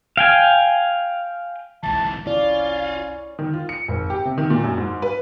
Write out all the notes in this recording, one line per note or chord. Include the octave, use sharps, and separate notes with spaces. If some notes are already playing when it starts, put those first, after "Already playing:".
F5 G5 G#5
F#1 C2 G#2 E3 A5
C#4 E4 F4 D5
D#3
F4
C#7
G#1
G4
C3
D#3
A#2
F#2
G#2
B4